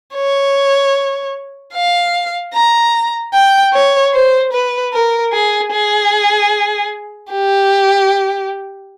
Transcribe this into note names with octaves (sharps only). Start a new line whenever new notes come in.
C#5
F5
A#5
G5
C#5
C5
B4
A#4
G#4
G#4
G4